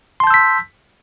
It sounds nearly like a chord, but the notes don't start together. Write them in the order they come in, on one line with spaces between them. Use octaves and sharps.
C6 A5 G6 E6 B6